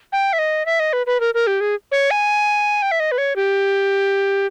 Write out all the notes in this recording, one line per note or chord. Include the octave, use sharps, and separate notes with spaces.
G5
E5
D#5
E5
D#5
B4
B4
A#4
A#4
G4
G#4
C#5
G#5
G5
E5
D#5
B4
C#5
G4